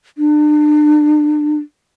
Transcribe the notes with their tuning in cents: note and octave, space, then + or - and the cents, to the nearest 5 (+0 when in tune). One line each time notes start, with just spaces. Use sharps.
D4 +35